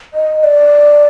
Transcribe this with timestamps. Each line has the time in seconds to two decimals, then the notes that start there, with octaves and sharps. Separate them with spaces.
0.14 D#5
0.40 D#5
0.44 D5